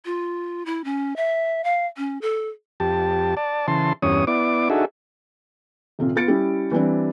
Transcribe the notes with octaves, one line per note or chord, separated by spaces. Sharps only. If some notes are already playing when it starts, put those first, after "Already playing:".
F4
E4
C#4
E5
F5
C#4
A4
F2 G4 A5
D5 A5
C#3 E3 A5 C6
E2 G2 C#4 C#5 D#6
B3 E4 D5 D6
D4 D#4 F#4 G#4 A4 E5
D#1 C3 F4
B3 F4 A6 C#7 D7
G3 C#4 E4 G4
E3 G3 C4 D4